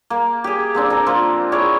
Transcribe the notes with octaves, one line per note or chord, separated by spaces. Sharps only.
A#3
G4 G#4
A#3 C4 D4
A4 A#5
F3 A#3 F4
E4 G#4 C#5 D5